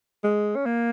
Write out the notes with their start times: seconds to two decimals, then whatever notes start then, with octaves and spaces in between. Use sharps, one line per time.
0.24 G#3
0.56 C#4
0.65 A#3